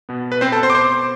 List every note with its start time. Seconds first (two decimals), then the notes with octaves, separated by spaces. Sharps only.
0.09 B2 B3
0.32 B4
0.41 C4 C5
0.52 A4 A5
0.63 C5 C6
0.70 D6
0.75 C5 C6